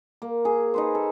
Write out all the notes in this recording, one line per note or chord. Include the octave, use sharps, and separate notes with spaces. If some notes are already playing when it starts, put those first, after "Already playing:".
A#3
G#4
D#4 B4 C5
A4